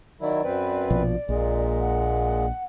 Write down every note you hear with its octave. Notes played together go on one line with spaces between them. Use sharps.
D#3 F#3 E4 D5
F#2 C4 B4
A#1 B2 F3
A#1 A#2 G#3
F#5